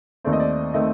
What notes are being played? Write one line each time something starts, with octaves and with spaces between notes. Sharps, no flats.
D#2 D#3 A3 C4 D5
D#5
D5
D#3 A3 C4 D#5